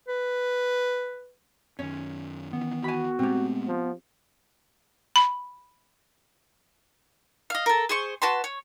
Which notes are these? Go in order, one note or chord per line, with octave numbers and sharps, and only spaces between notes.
B4
F#2 D#3 C#4
D#3 E3 B3
F#4 G#5 B5
A#2 G#3 A3 C4 G4
F3
B5
D#5 F5
A4 A#4
G#4 C5 C#6
F#4 B4 A5 C6
C#5